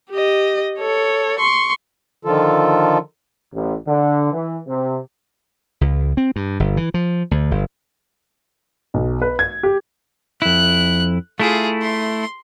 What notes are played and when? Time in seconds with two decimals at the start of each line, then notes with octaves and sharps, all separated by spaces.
0.11 G4 D#5
0.79 A4 C#5
1.39 C6 C#6
2.25 D3 D#3 F3 F4 A4
3.54 A1
3.88 D3
4.33 E3
4.68 C3
5.81 C#2
6.17 C4
6.36 G2
6.60 G1
6.77 E3
6.94 F3
7.31 D2
7.51 G1
8.94 B1
9.22 B4
9.39 G#6
9.63 G4
10.42 F2 E4 F#6
11.40 A3 E4 F4 G#4
11.82 C6